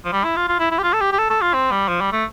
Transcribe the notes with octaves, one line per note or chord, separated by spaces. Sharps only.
F3
G3
E4
F4
F4
E4
E4
G4
F4
A4
G4
G4
A4
A4
F4
C4
G3
F3
G3
A3